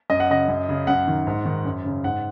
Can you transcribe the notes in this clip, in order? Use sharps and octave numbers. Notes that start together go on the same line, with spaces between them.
F#2 D#5
F#5
C#3 D#5
F#2
C#3
F#2 F#5
D#3
G#2
D#3
F#2
C#3
G#2 F#5